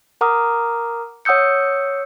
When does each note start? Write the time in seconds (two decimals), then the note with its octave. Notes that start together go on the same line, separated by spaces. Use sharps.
0.21 A#4 F#5 A#5 D6 D#6 F6
1.25 C#5 F#5 D#6 E6 G6 C#7